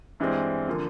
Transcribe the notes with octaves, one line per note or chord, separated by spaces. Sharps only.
G2 E3 G#3 C4
D3 F3 A#3